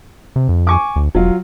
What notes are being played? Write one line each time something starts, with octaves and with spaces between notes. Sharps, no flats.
C3
F2
G#5 C#6 D6
D2
E1 F#3 F4